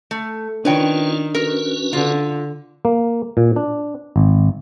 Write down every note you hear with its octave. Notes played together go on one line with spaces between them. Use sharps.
A3
D#3 C#4 D4 F4 B4 C#5 G5
C#4 F#4 A#4 B4
D3 F4
A#3
A#2
D4
G#1